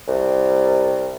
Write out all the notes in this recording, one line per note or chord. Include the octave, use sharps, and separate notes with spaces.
C2